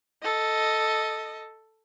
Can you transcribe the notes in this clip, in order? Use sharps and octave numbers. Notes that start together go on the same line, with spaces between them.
A4 D#5